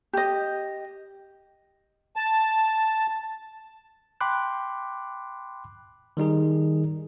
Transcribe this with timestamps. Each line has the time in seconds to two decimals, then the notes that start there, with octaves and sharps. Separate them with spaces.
0.13 G4 D#5
2.16 A5
4.21 G5 B5 C6 D6 F#6
6.17 D#3 G3 D#4 G#4